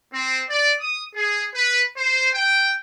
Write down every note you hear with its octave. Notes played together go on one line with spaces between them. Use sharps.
C4
D5
D#6
G#4
B4
C5
G5